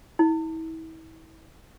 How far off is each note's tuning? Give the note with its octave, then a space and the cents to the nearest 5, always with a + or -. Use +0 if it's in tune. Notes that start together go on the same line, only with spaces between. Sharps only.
E4 -40